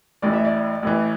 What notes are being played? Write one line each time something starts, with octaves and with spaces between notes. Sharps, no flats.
A1 A2 E3 D5
E5
D5
A1 A2 E3